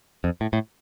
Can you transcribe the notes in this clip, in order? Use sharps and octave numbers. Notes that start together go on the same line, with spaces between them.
F2
A2
A2